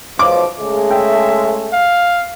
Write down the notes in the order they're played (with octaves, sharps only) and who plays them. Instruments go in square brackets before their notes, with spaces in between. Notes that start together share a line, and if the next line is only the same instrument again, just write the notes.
[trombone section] B1 F3 [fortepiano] D6
[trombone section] C#3 G#3 A3
[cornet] E5 [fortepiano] G5
[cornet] F5